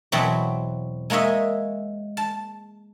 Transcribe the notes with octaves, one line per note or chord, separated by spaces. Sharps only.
E2 B2 F#3 C4 B5
G#3 A#3 C#5 D#5 E5
A5